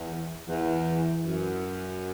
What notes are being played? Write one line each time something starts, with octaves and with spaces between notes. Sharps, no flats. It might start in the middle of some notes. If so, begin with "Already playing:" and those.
Already playing: E2
E3
E2 E3
F#2